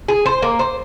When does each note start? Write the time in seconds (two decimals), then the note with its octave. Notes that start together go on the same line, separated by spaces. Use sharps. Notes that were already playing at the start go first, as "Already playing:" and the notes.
0.08 G#4
0.26 C5
0.42 A#3
0.59 C5